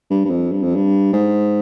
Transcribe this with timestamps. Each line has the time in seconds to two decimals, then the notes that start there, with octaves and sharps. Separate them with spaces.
0.10 G2
0.25 G2
0.30 F2
0.51 G2
0.63 F2
0.75 G2
1.13 G#2